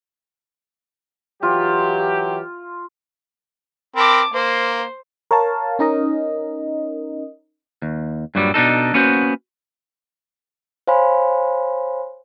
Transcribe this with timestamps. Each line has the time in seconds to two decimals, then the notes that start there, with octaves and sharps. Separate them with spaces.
1.43 E3 F#3 F4 G4
3.96 C4 A#4 A5 B5 D6
4.33 A#3 C5
5.31 A#4 C#5 F5 A5
5.79 C#4 D#4 A#4 D#5
7.82 D#2
8.35 G2 A#2 F#3 G3
8.54 B2 D4 D#4 A4
8.94 A#3 B3 C#4 F#4 B4 C5
10.87 C5 C#5 F5 G#5 B5 C6